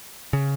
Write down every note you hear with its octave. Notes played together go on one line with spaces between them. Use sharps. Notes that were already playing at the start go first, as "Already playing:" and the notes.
C#3